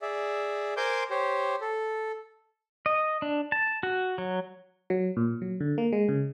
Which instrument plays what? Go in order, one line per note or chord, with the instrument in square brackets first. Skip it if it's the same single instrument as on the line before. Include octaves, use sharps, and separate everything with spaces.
[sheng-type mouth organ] G#4 D5 E5
A#4 C5 G#5 C6 D6 G6
G4 C5 C#5
A4
[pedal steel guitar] D#5
D4
A5
F#4
F#3
[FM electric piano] F#3
A#2
F#3
D3
A#3
G#3
C#3